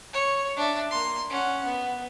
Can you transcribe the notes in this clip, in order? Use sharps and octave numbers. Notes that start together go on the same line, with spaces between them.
C#5
D4 E5
A#3 C6
C#4 F#5
B3